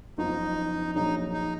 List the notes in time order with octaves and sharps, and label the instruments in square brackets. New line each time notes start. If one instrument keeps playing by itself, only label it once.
[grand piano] F#1 F2 F3 B3 F4 [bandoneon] D#4
[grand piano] A#1 A#2 F#3 [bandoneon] D#4
[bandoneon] D#4